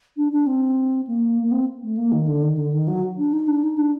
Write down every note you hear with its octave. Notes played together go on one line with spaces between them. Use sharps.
D4
D4
C4
A#3
A#3
C4
A3
A#3
D#3
D3
D#3
D3
D#3
F#3
D4
D#4
D4
D#4
D4